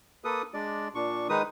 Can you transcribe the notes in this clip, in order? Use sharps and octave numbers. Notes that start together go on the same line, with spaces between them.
A#3 A4 B4 D#6
G#3 D4 D5
A#2 D4 C#6
D#3 G#3 D#4 B4 D#6